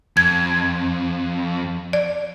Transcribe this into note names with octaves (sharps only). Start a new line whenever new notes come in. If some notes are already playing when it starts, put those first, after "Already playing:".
F2 G#6
D5